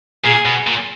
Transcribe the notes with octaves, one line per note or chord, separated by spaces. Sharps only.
A#2 G#4
B2
A#2